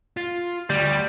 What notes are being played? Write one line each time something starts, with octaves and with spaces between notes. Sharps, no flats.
F4
D2 G3